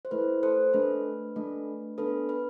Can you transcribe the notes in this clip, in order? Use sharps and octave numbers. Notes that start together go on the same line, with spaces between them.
C5
A3 E4 A4 B4
A4 C5
A3 D4 A4 B4
A3 D4 A4
B3 D4 A4 B4
B4